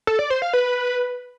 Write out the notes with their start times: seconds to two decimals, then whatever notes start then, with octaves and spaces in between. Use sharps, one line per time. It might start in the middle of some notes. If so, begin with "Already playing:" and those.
0.07 A4
0.19 D5
0.30 C5
0.42 F5
0.53 B4